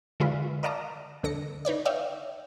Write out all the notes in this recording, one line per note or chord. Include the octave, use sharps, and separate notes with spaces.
D3 G#3 E4 F4 B4
A#4 D5 D#5 F5 A5 A#5
C#2 D3 A4 A#6 C#7
D#4 B4 C#5 D5
C#5 D5 E5 F5 G5